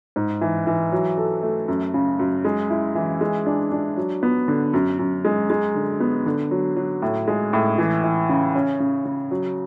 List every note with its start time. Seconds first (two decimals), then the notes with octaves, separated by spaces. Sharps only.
0.16 G#2
0.41 E3
0.67 E3
0.92 F#3
1.18 A4
1.43 A3
1.68 F#2
1.94 C#3
2.19 F#2
2.45 G#3
2.70 E4
2.95 E3
3.21 G#3
3.46 D4
3.72 D4
3.97 F#3
4.23 B3
4.48 D3
4.74 F#2
4.99 F#2
5.25 G#3
5.50 G#3
5.75 D3
6.00 B3
6.26 D3
6.51 F#3
6.76 F#3
7.02 A2
7.28 G#3
7.53 A2
7.78 E3
8.04 E3
8.29 C#3
8.55 C#4
8.80 C#3
9.05 C#3
9.31 F#3